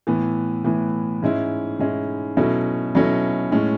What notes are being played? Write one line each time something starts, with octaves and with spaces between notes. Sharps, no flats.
A2 E3 B3
A2 E3 B3
G#2 G#3 C#4 E4
G#2 G#3 C#4 E4
B2 F#3 A3 C#4 E4
B2 F#3 A3 C#4 E4
A2 G#3 C#4